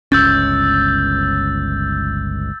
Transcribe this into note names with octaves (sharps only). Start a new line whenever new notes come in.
G1 C#2 C#4 E6 G6 A6